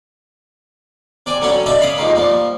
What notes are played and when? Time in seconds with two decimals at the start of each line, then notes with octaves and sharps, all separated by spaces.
1.26 C3 D5 G5 G#5
1.41 D3 F#3 G3 C#4 F#5 G#5
1.66 D4 D#5 E5 A5 B5
1.80 C#4 F5 B5 D6 D#6
1.98 F2 C3 D#3 G#3 A#3
2.16 F3 G3 A#3